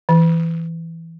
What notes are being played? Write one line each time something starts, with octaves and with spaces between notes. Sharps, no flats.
E3